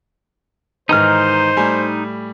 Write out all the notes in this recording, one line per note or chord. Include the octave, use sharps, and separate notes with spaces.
G#2 D#3 E3 D#4 C5 A#5 F6
A2 G3 G#5